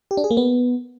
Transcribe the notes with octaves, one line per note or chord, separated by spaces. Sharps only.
G4
D4
G#4
A#3
B3